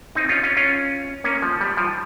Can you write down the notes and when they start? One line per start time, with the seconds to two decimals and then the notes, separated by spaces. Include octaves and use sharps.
0.15 C4 D#4
0.29 C#4 F4
0.43 C#4 F4
0.57 C#4 F4
1.24 A#3 C#4
1.42 F3
1.61 G3
1.77 F3